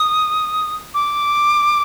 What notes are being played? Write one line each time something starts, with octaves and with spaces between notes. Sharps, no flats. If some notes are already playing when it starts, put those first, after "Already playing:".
Already playing: D#6
D6